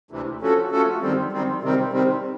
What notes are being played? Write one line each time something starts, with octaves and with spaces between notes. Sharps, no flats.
D2 C3 E3
F3 A3 C#4 F#4 A4
F3 A3 C#4 F#4 A4
F#2 D#3 G3 C4
F#2 D#3 G3 C4
C3 D#3 G3 C4
C3 D#3 G3 C4